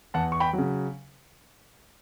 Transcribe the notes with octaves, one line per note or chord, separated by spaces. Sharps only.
E2 F#5 A5
C#6
G5 B5
F#3
C#3